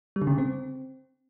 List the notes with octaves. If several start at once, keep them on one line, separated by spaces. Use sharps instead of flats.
G3
D3
C#3
D3
C4